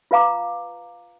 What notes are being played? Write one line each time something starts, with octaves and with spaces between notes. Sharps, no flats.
F4 B4 F5 A#5 D6